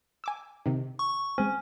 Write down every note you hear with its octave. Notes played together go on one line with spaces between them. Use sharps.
G#5 D6 E6
C3 D#3
C#6
G#3 C4 C#4